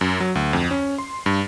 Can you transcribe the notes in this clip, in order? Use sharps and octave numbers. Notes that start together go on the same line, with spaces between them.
F#2
F#3
D2
F2
C#4
C6
G2